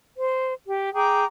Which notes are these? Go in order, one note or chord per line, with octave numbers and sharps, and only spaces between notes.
C5
G4
G#4 G5 A#5 D6